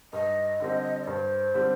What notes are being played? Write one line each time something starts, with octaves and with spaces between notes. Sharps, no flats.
G2 D#5
D3 G3 C4
D5
G2 C5
D3 G3 C4